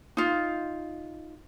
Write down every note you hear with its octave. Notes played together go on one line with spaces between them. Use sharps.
D#4 F4